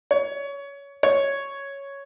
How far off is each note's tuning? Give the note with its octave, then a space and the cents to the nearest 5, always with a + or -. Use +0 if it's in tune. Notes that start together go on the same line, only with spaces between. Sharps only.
C#5 +20
C#5 +0